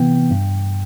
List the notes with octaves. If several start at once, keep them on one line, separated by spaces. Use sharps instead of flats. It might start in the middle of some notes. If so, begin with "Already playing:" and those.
Already playing: C3 E3 B3 G5
G2